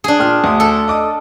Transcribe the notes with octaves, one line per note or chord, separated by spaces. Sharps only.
D4 G#4
A#2 G5 F6
D2 D#6
A4
D#5 D6 D#6